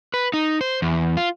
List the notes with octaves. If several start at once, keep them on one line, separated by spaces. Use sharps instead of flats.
B4
D#4
C5
E2
F4